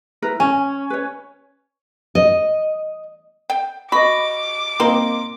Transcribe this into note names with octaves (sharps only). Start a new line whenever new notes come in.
E4 A#4 B4
C#4 G#5
B4 C#5
D#5
G5
F#4 D#5 B5 D6
A#3 C4 D#4 C6